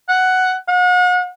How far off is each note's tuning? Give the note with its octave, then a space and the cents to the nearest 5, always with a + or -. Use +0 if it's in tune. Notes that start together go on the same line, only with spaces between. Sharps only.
F#5 +5
F#5 -40